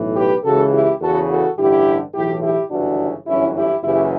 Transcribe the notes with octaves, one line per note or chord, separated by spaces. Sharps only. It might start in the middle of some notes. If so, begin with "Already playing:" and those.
Already playing: B1 A2 E3
G4 B4
C#2 C#3 E3 F#4 A4
E4 G4
E2 C#3 E3 F#4 A4
F#4 A4
A1 G2 D3 E4 G4
B1 A2 E3 E4 G4
E4 G4
G1 F#2 C#3 E3 D4 F#4
G1 F#2 E3 C#4 E4
E4 G4
F#1 F#2 C#3 E3 E4 G4